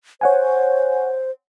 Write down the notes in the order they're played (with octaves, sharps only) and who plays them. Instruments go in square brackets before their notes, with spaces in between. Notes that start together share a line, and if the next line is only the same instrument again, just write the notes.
[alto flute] C5 [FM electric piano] C#5 F#5 G#5